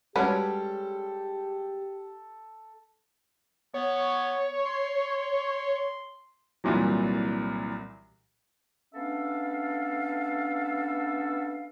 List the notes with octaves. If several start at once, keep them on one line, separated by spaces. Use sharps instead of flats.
G3 G#3 C#4 F#4 G4 A4 B4
B3 C#5
C6
C2 A#2 E3 F#3
B3 C#4 D4 A4 E5 F5